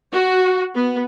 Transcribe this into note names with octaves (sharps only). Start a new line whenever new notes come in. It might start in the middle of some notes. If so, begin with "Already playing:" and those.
F#4
B3